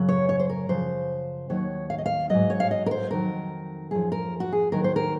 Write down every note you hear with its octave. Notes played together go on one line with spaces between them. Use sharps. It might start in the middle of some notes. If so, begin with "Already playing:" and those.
Already playing: F#2 C#3 F#3
C#5
C#5
C5
A#4
F#2 C#3 F3 C5
D#2 D#3 F#3 C#5
F5
D#5
F5
G#2 F#3 D#5
C#5
F5
D#5
A#4
C5
F2 D#3 F#3 A#4
F#2 F3 G#4
A#4
F#4
G#4
D#2 D#3 F#3 A#4
C5
A#4